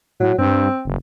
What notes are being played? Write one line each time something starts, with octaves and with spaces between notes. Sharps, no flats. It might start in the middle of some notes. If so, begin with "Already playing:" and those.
A2 F#3
G2 C4
F#1